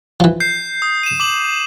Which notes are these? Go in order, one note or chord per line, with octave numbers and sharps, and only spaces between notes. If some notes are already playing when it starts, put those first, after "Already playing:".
E3 F3
G6 C7
D#6
D#7 E7
D6 F#7